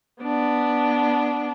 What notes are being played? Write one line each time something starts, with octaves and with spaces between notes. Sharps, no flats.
B3 D4